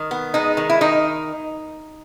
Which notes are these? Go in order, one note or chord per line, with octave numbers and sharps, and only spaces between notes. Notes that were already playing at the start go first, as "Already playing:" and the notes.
Already playing: D#3
B3
G#3 D#4
D#3
E4
D#3 D#4